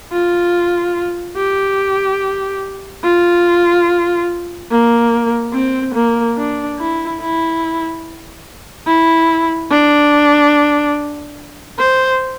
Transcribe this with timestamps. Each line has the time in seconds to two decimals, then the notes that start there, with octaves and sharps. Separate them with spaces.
0.12 F4
1.37 G4
3.03 F4
4.70 A#3
5.53 C4
5.94 A#3
6.37 D4
6.79 E4
7.20 E4
8.87 E4
9.70 D4
11.79 C5